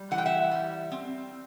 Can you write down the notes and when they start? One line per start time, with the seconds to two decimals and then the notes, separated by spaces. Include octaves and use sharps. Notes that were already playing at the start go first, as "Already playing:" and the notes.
Already playing: G3
0.11 E3 F#5
0.18 G5
0.26 E5 F#5
0.51 G3
0.92 C4